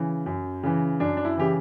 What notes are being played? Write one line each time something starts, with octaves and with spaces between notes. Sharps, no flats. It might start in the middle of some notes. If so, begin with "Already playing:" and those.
Already playing: C#3 E3
F#2
C#3 E3
F#2 D4
D4
E4
C#3 E3 G4